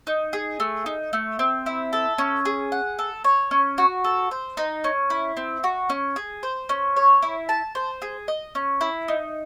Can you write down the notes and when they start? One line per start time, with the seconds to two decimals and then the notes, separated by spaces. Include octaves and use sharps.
0.07 D#4
0.33 G#4
0.60 A3
0.86 D#4
1.13 A3
1.39 C4
1.66 E4
1.93 A4
2.18 C#4
2.45 G#4
2.72 F#5
2.99 A4
3.24 C#5
3.51 C#4
3.78 F#4
4.04 A4
4.31 C5
4.57 D#4
4.84 C#4
5.10 E4
5.37 C4
5.64 F#4
5.90 C#4
6.16 G#4
6.43 C5
6.69 C#4
6.96 C#5
7.22 E4
7.49 A5
7.75 C5
8.02 G#4
8.28 D#5
8.55 C#4
8.81 E4
9.08 D#4